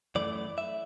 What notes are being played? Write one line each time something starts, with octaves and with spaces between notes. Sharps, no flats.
F#2 E3 A3 D5
E5